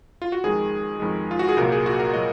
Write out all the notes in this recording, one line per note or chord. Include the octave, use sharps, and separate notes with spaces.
F4
F#4
F2 D#3 G#3 G#4
F2 D#3 G#3
F4
F#4
G#4
C2 A#2 F#3 A#3 A#4
G#4
F#4
A#4
A#2 F#3 A#3 D#5